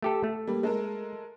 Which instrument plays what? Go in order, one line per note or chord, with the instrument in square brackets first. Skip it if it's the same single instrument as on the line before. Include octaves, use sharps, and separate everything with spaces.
[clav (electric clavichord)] A3 G4 A4
A3
[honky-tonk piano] G3 A#3
G#3 A4 A#4